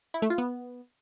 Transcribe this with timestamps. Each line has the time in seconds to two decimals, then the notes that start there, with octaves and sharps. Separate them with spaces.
0.14 E4
0.22 A3
0.30 F4
0.38 B3